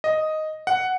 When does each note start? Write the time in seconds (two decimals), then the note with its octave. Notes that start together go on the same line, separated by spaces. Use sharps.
0.04 D#5
0.67 F#5